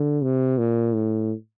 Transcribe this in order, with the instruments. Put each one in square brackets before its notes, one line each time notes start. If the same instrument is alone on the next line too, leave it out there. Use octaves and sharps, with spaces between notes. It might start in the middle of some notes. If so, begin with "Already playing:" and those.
Already playing: [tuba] D3
C3
A#2
A2